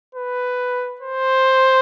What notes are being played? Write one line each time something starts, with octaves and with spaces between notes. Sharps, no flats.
B4
C5